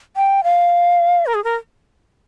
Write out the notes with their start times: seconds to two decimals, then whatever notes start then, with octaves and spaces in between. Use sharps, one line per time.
0.17 G5
0.44 F5
1.26 A#4
1.34 G#4
1.44 A#4